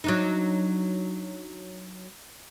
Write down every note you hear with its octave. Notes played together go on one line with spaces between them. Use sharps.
F#3 D4 D#4